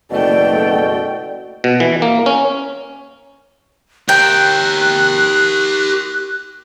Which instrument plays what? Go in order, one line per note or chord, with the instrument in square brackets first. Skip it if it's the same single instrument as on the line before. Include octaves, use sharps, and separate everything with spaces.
[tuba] F#1 [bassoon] B2 [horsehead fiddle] A3 G5 [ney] D5
[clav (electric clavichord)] B2
E3
A#3
C#4
[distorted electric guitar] G4 A#4 [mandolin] G5 [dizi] F#6